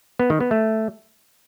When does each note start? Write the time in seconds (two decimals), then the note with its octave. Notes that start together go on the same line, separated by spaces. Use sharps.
0.19 B3
0.30 D#3
0.40 B3
0.51 A3